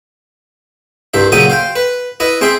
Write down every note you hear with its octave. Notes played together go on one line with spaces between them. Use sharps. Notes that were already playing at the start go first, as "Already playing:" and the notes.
C2 G2 C5 E5
A#2 C#3 F#3 E5 G5 D#6
C5 F5 G5
B4
E4 B4 D#5
C4 G#4 C5 E5 C6